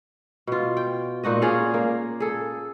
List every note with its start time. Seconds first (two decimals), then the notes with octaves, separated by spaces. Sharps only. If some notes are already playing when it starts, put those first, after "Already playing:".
0.47 B2 F4
0.77 G5
1.24 A#2 D#4 F#4 D#5
1.42 C#4 G#4 D5 F5
1.74 A#3
2.20 G#4 A4